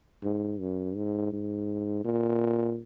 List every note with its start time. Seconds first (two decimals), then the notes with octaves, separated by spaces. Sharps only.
0.23 G#2
0.60 F#2
0.96 G#2
1.33 G#2
2.05 A#2